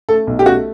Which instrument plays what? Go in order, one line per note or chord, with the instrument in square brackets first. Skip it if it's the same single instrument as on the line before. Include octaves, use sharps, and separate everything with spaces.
[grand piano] A3 A4
B1
G4
A3 F#4